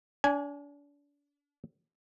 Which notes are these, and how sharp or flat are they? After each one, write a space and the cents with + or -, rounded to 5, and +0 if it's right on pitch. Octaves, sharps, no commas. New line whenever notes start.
D4 -35 G#5 +0